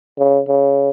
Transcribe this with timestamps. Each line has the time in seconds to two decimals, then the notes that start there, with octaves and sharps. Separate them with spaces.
0.19 C#3
0.48 C#3